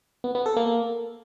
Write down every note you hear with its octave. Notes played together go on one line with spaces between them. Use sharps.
B3
B3
A4
A#3